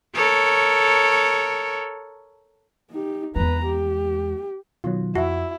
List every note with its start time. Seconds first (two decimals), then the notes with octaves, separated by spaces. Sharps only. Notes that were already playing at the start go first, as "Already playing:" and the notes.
0.15 A4 A#4 C#5
2.91 D#4 G4
3.36 E2 G#3 B4 A#5
3.65 G4
4.84 B2 D#3 F#3 F4
5.15 F2 E4 F#4 E5